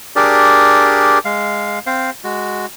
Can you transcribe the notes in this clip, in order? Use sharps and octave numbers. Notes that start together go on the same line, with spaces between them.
D4 G4 G#4 A#4 D5
G#3 F5
C4 C5 F5
G#3 F#4